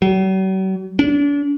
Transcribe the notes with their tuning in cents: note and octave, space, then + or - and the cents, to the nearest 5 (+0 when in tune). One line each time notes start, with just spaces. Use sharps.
F#3 +45
D4 -40